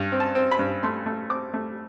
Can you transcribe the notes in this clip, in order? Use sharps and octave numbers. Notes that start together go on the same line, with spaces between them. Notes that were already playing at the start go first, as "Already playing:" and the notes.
Already playing: G2
C4
A5
C4
B5
G2
A3 C6
A3
C4 D6
A3